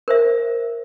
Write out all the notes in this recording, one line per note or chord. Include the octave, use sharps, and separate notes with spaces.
A#4 C5 E5